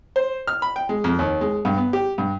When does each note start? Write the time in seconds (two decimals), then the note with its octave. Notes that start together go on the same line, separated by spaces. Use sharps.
0.16 C5
0.47 F6
0.62 B5
0.76 G5
0.89 G#3
1.04 F2
1.19 D#2
1.41 G#3
1.65 G2
1.77 B3
1.93 G4
2.18 G2